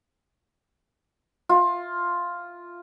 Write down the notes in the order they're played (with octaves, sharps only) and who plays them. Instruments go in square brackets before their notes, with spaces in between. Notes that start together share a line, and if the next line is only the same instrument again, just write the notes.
[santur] F4